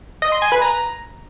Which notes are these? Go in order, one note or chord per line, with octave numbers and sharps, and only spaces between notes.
D#5
C6
G#5
B4
A#5